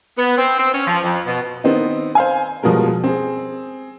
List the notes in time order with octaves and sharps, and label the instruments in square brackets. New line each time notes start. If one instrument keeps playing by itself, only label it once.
[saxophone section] B3
C4
C4
C#4
F3
F2
B2
[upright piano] D#3 B3 C4 D#4
C5 F5 G#5
B2 F3 G3 G#3 A#4
C4 G#4